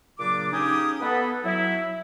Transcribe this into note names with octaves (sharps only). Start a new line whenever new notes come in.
A#2 C#3 F#3 D4 D6
C#3 C#4 D#4 G4 G#5 D#6
B3 A4 B4
F#3 E4